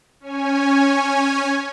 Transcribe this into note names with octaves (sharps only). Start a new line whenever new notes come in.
C#4 C#5 G#5